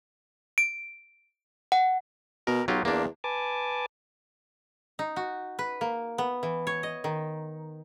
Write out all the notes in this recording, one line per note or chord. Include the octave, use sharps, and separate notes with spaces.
D7
F#5
B2 A#4
B1 F#3 F4 G4
E2 A#3 D4
B4 G#5 A5 D6
D#4
F#4
B4
A#3
B3
E3
C#5
D#5
D#3